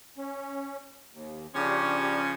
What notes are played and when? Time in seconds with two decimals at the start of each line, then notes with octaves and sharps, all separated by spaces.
0.18 C#4
1.13 D#2
1.55 C#3 F3 C#4 D4 G4